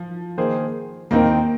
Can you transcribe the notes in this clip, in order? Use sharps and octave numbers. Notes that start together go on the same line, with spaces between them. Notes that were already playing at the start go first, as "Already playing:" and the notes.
Already playing: F3
D#3 A#3 G#4 C5
D#2 D#3 A#3 C4 D#4 A#4